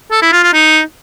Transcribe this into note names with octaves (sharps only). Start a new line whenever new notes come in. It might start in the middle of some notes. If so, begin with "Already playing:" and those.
A4
E4
F4
F4
D#4